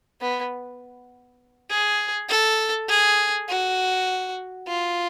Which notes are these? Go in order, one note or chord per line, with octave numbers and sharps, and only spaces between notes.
B3
G#4
A4
G#4
F#4
F4